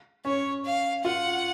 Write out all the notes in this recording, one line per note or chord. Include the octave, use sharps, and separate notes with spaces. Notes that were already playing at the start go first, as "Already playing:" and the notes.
C#4 C#5
F5
F4 F#5